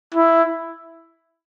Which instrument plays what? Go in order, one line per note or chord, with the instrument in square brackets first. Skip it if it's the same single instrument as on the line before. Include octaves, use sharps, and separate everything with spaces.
[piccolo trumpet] E4